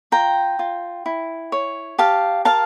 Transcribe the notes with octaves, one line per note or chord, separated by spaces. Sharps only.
F4 G5 A#5
F4
E4
C#5
G4 F5 A5
A#4 F5 A5